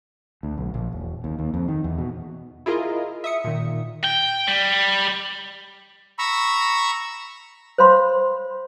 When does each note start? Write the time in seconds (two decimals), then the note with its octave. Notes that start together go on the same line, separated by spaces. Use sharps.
0.43 D2
0.58 B1
0.74 A#1
0.92 E1
1.24 D#2
1.39 D#2
1.54 F2
1.68 D#3
1.84 E2
1.98 B2
2.66 E4 F4 G#4 A#4 D#5
3.24 E5 D#6 C#7
3.44 A#2 D#3
4.04 G5
4.47 G3
6.19 A#5 B5 C#6 E6
7.78 C5 C#5 F5 B5 C6